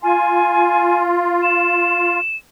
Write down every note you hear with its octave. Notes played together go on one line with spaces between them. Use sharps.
F4 G#5
E7